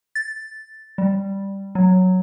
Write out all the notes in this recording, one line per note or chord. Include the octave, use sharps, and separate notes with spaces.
A6
G3
F#3